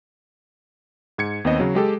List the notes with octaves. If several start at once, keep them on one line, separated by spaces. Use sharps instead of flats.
G#2 G#6 C#7
D#2 B3 C4 D#5
C#3 F#3
G#3 G4 A4